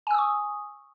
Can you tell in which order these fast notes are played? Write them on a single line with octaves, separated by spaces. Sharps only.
G#5 E6 D#6 C#6